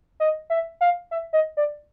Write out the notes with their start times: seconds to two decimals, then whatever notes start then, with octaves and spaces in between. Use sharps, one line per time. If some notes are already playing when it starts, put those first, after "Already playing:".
0.20 D#5
0.50 E5
0.81 F5
1.11 E5
1.33 D#5
1.57 D5